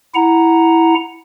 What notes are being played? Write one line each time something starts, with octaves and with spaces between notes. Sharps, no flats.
E4 F#5 A#5